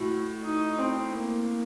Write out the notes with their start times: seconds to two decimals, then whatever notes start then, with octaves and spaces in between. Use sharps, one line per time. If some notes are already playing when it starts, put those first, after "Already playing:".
Already playing: A2 F#4
0.44 D#4
0.79 C4
1.14 A#3